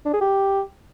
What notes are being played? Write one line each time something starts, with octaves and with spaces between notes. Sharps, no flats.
D4
G#4
G4